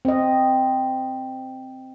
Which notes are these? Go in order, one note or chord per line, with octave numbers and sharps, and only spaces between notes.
C4 D#5